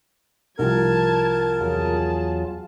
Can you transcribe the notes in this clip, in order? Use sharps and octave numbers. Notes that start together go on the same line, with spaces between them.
C2 F3 A#4 A5 G#6
E2 F#3 F4 G#4 A5